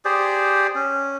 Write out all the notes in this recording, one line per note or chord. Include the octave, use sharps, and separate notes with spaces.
G4 G#4 C5 D5
C#4